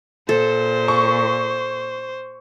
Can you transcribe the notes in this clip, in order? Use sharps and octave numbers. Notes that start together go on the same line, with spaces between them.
A#2 A4 C5
C#6